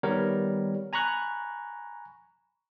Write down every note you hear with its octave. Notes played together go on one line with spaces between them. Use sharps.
D#3 G3 B3 A#4 C#5
G#5 A#5 B5 C#6 F#6